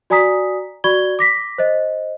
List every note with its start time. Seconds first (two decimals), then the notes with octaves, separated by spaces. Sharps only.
0.10 F#4 D5 G#5 A#5 D#6 B6
0.84 F#4 D5 B5 C#6 G#6 G7
1.19 D6 A#6 B6
1.58 C5 D#5